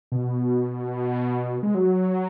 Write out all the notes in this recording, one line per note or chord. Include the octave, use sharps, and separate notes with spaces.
B2
G#3
F#3